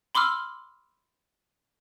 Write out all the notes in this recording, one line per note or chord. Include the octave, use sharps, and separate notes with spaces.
B5 C6 D6 E6 F6